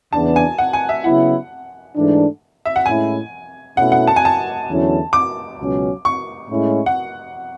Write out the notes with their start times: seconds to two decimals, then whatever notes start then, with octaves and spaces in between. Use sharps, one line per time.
0.13 E2 C#3 E3 B3 D4 A5
0.36 G#5
0.58 F#5
0.73 G#5
0.89 E5
1.04 C#3 F#3 B3 E4 F#5
1.95 G#2 E3 A3 D4
2.65 E5
2.76 F#5
2.86 A2 G#3 C#4 E4 G#5
3.77 B2 A3 C#4 E4 F#5
3.92 F#5
4.07 A5
4.16 G#5
4.25 A5
4.68 E2 D3 F#3 C#4 E4
5.13 D6
5.58 C#2 B2 F#3 C#4
6.05 C#6
6.50 A2 G#3 C#4 E4
6.86 F#5